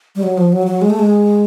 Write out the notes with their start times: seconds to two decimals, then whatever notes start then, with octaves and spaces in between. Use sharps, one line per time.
0.16 G3
0.23 F#3
0.38 F3
0.52 F#3
0.67 F#3
0.82 G#3
0.90 A3
0.99 G#3